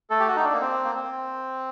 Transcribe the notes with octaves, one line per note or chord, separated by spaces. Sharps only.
A3 A4
G4
F#4
D#4
D4
A#3
C4
A#3
C4